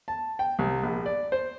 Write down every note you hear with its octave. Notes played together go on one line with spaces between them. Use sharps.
A5
G5
C2
A#1
D5
C5